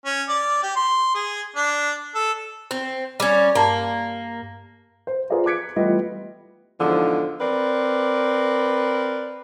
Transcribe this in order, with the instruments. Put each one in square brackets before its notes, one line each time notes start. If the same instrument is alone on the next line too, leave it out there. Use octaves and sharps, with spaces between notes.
[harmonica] C#4
D5
G4
C6
G#4
D4
A4
[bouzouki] C4
G3 C#4
[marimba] G2 A5 [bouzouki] A#3
[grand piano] C5
F4 G#4 B4 C5 D5 A#5
D6 F#6 G#6 B6 C#7 D7
E3 G3 A3 B3 F4 D#5
[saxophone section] E2 G#2 D3 F3
C4 A#4 B4 D5